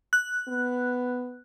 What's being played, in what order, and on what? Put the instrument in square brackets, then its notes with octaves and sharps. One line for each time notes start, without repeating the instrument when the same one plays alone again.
[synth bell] F#6
[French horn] B3